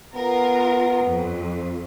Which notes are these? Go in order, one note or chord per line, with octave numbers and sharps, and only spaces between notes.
B3 F4 A#4
F2